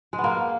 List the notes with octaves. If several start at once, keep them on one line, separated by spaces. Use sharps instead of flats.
G#3
B3
A#3